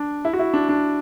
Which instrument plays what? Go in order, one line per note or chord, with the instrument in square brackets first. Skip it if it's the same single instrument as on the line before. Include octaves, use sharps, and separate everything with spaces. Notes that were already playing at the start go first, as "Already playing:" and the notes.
Already playing: [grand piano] D4
E4
F#4
E4
D4
D4